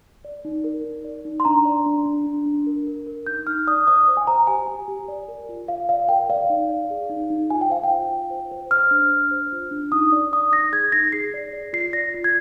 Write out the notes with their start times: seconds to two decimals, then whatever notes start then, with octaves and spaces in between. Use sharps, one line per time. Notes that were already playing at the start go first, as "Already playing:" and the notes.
0.25 D5
0.45 D#4
0.64 A#4
0.84 D#4
1.05 D5
1.25 D#4
1.40 C6
1.45 D4 A#5
1.65 D5
1.86 D4
2.06 D4
2.26 D4
2.46 D4
2.67 A#4
2.87 A#4
3.07 A#4
3.27 D#4 G6
3.47 D#4 F6
3.67 D5 D#6
3.87 C5 D#6
4.08 C5
4.17 G#5
4.27 C5 A#5
4.47 G4 G#5
4.67 G4
4.88 G4
5.08 D5
5.28 A#4
5.49 F4
5.68 F4 F5
5.89 D5 F5
6.09 A#4 G5
6.30 D5 F5
6.50 D#4
6.69 D5
6.90 G#4
7.10 D#4
7.30 D#4
7.50 F4 G#5
7.61 G5
7.70 C5 F5
7.84 G5
7.90 F4
8.11 F4
8.30 C5
8.51 C5
8.71 C5 F6
8.91 D4
9.11 D4
9.31 C5
9.52 F4
9.71 D4
9.92 D#4 D#6
10.12 D5
10.32 D5 D#6
10.52 D#4 A#6
10.72 G#4 G#6
10.92 D#4 A#6
11.12 G#4 C7
11.34 D5
11.53 D5
11.73 F4 C7
11.93 D5 A#6
12.14 F4
12.24 G#6